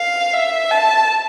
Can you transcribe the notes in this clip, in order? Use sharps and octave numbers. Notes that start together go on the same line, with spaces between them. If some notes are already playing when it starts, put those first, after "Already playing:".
Already playing: F5
E5
A5